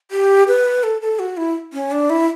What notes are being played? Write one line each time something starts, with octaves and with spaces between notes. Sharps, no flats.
G4
B4
A4
A4
F#4
E4
C#4
D4
E4